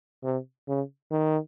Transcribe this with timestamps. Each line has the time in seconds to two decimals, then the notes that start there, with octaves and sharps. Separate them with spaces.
0.24 C3
0.68 C#3
1.11 D#3